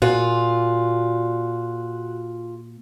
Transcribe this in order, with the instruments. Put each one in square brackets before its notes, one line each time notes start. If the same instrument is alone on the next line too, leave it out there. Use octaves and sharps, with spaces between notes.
[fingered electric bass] A#2 [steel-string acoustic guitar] F4 G#4 [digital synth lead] F#4